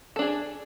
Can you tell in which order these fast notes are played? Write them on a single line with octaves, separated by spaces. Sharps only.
A4 D4 G#4